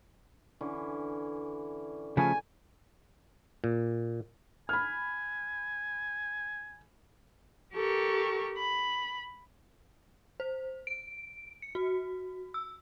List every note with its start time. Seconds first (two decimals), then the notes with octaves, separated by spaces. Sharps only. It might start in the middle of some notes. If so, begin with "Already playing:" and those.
0.61 D3 E3 C#4
2.17 C#3 F3 A3 G#5
3.64 A#2
4.69 G#5 B5 F6
7.74 G4 A4 A#4 C#6
8.57 B5
10.40 C5
10.87 D7
11.62 C#7
11.75 F#4
12.54 E6